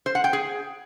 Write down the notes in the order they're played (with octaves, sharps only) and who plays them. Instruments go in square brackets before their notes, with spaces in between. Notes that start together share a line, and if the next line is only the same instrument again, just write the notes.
[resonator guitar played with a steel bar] C5
F#5
G5
G#4